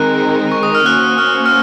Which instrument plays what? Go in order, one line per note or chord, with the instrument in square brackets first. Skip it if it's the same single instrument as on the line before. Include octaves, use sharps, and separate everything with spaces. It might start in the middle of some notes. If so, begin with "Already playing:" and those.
Already playing: [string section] D#3 G#3 C4 D#4 A#4 [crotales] F#6
[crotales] C#6
D#6
F6
[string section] A#3 C#4 F#4 C5 [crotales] F#6
[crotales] F6
F6